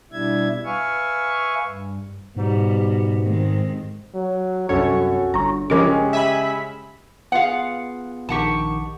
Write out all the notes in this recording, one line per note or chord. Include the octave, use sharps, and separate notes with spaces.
B2 G3 D4 E4 E5 G#6
B4 E5 F5 G#5 C#6
G2
G#2 B2 G3
D#3 G#3 C4
F#3
C2 F#2 C#4 F#4 A4 C#5
G1 C#5 A#5
C#3 F3 G#3 C#4 G4 A#4 D6
E5 G#5 B5
B3 F4 G#4 F5 F#5
A#1 D#3 G4 F#5 A5 C#6